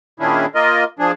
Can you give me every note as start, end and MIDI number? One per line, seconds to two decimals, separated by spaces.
0.20 0.46 46
0.20 0.46 51
0.20 0.46 61
0.20 0.46 62
0.20 0.46 64
0.20 0.46 68
0.55 0.84 58
0.55 0.84 65
0.55 0.84 70
0.55 0.84 75
0.99 1.12 53
0.99 1.12 62
0.99 1.12 68